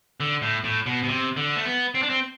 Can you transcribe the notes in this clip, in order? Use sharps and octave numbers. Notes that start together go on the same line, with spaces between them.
D3
A2
A2
B2
B2
C3
D3
A3
B3
C4
D4
C4